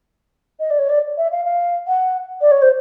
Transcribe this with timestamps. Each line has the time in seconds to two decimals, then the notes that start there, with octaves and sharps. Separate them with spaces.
0.59 D#5
0.70 D5
0.79 C#5
0.89 D5
1.17 E5
1.32 F5
1.45 F5
1.87 F#5
2.41 D5
2.51 C#5
2.62 C5